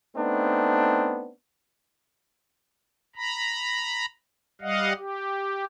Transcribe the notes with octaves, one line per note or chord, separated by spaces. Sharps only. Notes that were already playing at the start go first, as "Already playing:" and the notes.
A3 B3 C4 D4 D#4
A#5 B5
G3 D#5 F5 F#5
G4